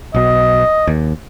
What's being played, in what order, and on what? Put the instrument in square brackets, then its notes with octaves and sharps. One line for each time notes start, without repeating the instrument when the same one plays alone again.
[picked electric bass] B1 B2 [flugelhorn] D#5
[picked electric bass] D#2